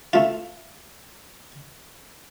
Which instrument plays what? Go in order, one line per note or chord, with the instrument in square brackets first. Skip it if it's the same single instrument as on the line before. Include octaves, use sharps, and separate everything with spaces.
[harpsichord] A3 F4